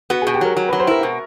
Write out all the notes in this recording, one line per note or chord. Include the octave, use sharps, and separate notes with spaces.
B3 F#4
G#4
B2
G4
F#3 A#4
F#3
B4
F#3
C5
E4 A#4
B2